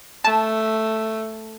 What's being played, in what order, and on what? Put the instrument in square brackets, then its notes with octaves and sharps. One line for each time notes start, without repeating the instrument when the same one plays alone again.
[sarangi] A3 [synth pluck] A5